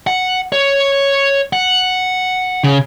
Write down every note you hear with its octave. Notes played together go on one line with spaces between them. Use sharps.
F#5
C#5
F#5
C#3